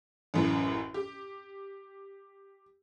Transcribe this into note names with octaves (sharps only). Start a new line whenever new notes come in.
A1 F#2 A2
G4